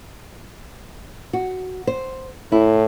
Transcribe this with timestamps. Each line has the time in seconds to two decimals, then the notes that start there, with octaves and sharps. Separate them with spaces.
1.33 F#4
1.87 C5
2.52 A2 E4